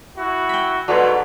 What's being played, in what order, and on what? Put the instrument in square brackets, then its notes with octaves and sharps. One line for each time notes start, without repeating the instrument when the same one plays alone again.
[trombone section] E4 F#4
[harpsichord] G5 B5
[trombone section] G#2 B2 F#3 [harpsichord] D3 [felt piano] F#4 B4 C6